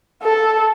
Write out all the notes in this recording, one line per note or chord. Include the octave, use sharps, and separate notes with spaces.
A4